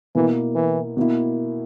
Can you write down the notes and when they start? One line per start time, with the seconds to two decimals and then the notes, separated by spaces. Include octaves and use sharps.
0.15 B2 E3 A#3 E4
0.55 E3
0.97 B2 A#3 E4